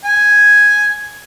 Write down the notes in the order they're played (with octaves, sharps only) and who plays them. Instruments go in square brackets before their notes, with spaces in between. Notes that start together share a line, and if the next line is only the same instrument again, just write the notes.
[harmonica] G#5